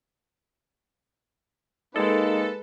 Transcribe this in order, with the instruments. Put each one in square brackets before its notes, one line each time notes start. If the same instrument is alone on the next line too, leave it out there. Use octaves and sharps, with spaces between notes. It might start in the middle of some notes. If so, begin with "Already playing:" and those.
[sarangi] G#3 [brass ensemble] A#3 D#4 [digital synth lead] A4 [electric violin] B4